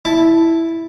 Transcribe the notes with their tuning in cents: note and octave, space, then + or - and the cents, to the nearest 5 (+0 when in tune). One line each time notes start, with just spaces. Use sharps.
E4 +0 A5 +0